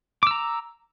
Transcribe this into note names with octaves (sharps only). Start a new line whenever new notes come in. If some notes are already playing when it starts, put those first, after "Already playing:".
A#5 D6 E6